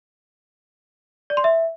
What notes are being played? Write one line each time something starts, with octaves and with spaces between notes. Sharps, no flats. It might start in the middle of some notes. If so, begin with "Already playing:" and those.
D5
C6
E5